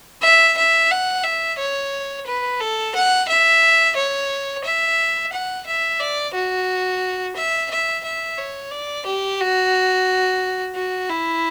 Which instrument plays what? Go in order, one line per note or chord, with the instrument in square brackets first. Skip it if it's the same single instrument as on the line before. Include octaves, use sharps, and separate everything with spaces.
[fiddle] E5
E5
F#5
E5
C#5
B4
A4
F#5
E5
C#5
E5
F#5
E5
D5
F#4
E5
E5
E5
C#5
D5
G4
F#4
F#4
E4